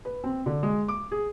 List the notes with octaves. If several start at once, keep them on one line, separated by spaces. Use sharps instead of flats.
B4
C4
D3
G#3
D6
G#4